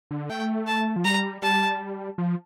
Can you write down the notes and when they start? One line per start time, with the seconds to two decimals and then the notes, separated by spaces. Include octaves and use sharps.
0.11 D3
0.30 A3 G5
0.67 A5
0.96 F3
1.04 G3 A#5
1.42 G3 A5
2.18 F3